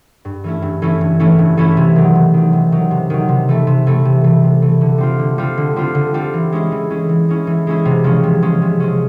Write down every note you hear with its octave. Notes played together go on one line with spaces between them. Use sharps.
G2
E3 A3 C#4 E4
G2
E3 A3 C#4 E4
G2
E3 A3 C#4 E4
G2
E3 A3 C#4 E4
C3
D#3 F#3
C3
D#3 F#3
C3
D#3 F#3
C3
D#3 F#3
C3
E3 A3
C3
E3 A3
C3
E3 A3
C3
E3 A3
D3
G3 C4 F4
D3
G3 C4 F4
D3
G3 C4 F4
D3
G3 C4 F4
E3
G#3 C#4 E4
E3
G#3 C#4 E4
E3
G#3 C#4 E4
E3
G#3 C#4 E4
C3
F3 G#3 C#4
C3
F3 G#3 C#4
C3
F3 G#3 C#4